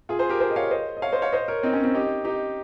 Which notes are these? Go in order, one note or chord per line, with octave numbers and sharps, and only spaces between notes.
F4 G#4
G#4 C5
G4 A#4
G#4 C5
D#5
C#5 F5
C5 D#5
D#5
C#5 F5
C5 D#5
C#5 F5
C5 D#5
A#4 C#5
C4 D#4
C#4
C4 D#4
D#4 G4
D#4 G4